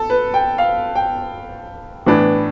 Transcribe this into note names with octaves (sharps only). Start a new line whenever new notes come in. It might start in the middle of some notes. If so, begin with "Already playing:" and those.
Already playing: A4
B4
G5
F5
G5
A2 E3 B3 D4